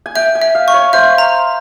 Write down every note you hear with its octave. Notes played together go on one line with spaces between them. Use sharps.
G#5
E5 G5
G#5
E5
F5
C#6
C#5
C5 E5
A#5